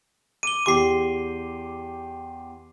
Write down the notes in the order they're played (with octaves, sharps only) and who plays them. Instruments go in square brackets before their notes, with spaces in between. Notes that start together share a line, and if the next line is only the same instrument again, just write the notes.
[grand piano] D6 [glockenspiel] D#7 G7
[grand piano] E2 G4 C6 [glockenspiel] D6 C7